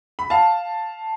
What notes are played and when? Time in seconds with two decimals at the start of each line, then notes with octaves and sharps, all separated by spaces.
0.19 B5
0.30 F5 A5